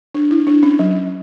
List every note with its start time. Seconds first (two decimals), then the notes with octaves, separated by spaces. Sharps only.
0.15 D4
0.31 E4
0.47 D4
0.63 C#4
0.79 F#3